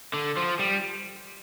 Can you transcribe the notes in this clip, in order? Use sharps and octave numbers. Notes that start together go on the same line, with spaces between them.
D3
F3
G3